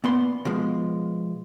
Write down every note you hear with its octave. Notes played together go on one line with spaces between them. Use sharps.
A#2 B3 C6
B2 F3 G#3